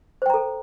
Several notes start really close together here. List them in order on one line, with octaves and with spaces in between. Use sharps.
C5 G5 A#5 A4